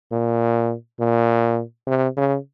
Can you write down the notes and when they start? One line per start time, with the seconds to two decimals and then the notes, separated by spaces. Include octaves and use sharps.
0.12 A#2
1.00 A#2
1.87 C3
2.17 C#3